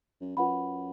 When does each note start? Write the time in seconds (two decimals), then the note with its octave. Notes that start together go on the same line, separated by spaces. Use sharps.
0.21 F#2
0.37 F#2 F4 B4 F#5 B5